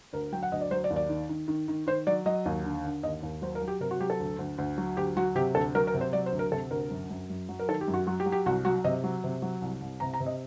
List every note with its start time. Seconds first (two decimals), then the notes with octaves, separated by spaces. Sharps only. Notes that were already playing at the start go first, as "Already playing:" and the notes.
0.13 D2 A#4
0.32 F#3 G5
0.43 F#5
0.52 D2 D#5
0.61 D5
0.71 F#3 C5
0.84 D5
0.90 D#2
0.96 D5
1.09 D#3
1.29 D#3
1.48 D#3
1.68 D#3
1.87 D#3 C5
2.07 F#3 D5
2.26 F#3 D#5
2.46 D#2
2.64 D3
2.85 D3
3.03 D#2 D#5
3.23 D#2
3.42 F#3 C5
3.55 A#4
3.62 F#3
3.68 G4
3.80 C3 A#4
3.91 F#4
4.00 F#3 G4
4.10 A4
4.20 D2
4.39 D2
4.58 D2
4.78 F#3
4.97 D2 G4
5.17 F#3 F#4
5.35 C3 G4
5.55 D2 A4
5.75 F#3 A#4
5.87 A#4
5.94 C3
6.01 C5
6.13 F#3 D5
6.26 C5
6.32 D2
6.39 A#4
6.52 C3 A4
6.71 D2 A#4
6.91 F#2
7.10 F#2
7.30 F#2
7.49 F#3
7.59 A#4
7.69 D#3 A4
7.81 G4
7.88 F#2
7.94 F#4
8.07 F#3 F#4
8.20 G4
8.26 F#3
8.32 G4
8.46 C2 F#4
8.65 F#3 F#4
8.84 C3 D#5
9.04 F#3
9.24 C3
9.42 F#3
9.62 C2
9.81 C2
10.00 C3 A#5
10.13 A#5
10.20 C3
10.26 D#5